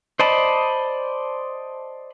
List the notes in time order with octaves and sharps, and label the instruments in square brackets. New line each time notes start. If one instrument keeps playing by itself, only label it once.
[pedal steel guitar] C5 D5 D#5 A5 B5